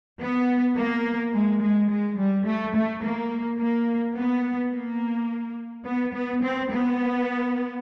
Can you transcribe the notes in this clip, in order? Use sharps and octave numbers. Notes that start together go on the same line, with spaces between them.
B3
A#3
G#3
G#3
G#3
G3
A3
A3
A#3
A#3
B3
A#3
B3
B3
C4
B3